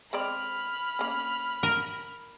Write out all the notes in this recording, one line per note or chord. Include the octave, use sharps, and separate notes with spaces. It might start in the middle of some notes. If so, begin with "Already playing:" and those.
G#3 C4 D5 B5 F6
A#3 C#4
A#4